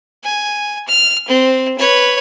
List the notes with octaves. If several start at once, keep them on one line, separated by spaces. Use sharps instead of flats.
G#5
F6
C4
B4 C#5